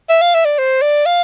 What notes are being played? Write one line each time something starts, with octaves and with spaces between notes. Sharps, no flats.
E5
F5
E5
D5
C5
D5
F5